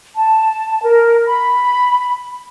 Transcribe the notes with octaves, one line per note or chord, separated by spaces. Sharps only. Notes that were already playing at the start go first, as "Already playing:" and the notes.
A5
A#4
B5